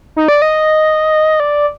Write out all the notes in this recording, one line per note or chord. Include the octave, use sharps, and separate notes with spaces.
D#4
D5
D#5
D5